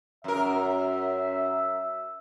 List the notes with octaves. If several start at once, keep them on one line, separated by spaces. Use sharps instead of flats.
F#2 A#4 E5